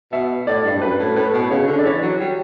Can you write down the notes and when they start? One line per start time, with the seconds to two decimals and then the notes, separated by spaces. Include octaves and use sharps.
0.12 B2 E5
0.47 A2 D5
0.65 G2
0.76 G2
0.82 F#2 B4
0.99 A2
1.16 A2 B4
1.33 B2
1.50 C#3 C#5
1.68 D3
1.79 D5
1.85 E3 C#5
2.02 F#3
2.19 G3